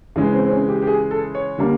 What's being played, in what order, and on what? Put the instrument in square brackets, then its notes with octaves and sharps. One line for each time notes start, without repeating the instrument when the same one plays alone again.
[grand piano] C#3 E3 G#3 C#4
C4
C4
C#4
G4
G4
G#4
A4
C#5
D3 G3 A#3